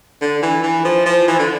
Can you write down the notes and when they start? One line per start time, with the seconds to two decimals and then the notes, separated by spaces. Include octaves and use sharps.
0.22 D3
0.43 E3
0.63 E3
0.85 F3
1.06 F3
1.28 E3
1.39 D3